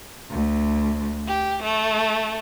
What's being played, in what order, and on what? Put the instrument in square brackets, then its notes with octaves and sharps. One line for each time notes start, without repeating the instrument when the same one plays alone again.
[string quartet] D2
G4
A3